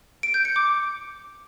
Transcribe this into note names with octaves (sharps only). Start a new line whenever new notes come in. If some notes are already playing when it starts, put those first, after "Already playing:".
D7
G6
C#7
D6